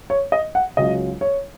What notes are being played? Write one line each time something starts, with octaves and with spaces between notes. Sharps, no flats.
C#5
D#5
F#5
C#2 C#3 F#3 D#5
C#5